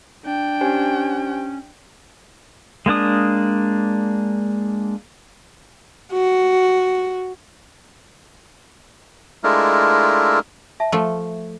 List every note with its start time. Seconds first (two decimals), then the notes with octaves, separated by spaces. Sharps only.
0.24 D4 G5
0.61 C#4 G4 C5 G#5
2.86 G#3 A#3 D4 D#6
6.12 F#4
9.44 G#3 A3 D4 E4 F4 A#4
10.80 E5 A5
10.92 F3 A3